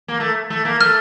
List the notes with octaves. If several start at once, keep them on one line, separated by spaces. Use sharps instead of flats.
A#3
A3
A3
A#3
A3 F6